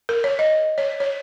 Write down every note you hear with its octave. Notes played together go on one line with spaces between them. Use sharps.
A#4
C#5
D#5
C#5
C#5